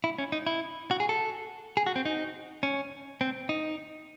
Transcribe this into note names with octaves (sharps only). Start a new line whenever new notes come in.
E4
C#4
D#4
E4
F#4
G#4
A4
G#4
F#4
C4
D#4
C#4
C4
D#4